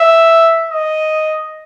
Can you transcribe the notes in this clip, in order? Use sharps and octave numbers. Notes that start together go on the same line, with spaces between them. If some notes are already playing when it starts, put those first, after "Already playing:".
Already playing: E5
D#5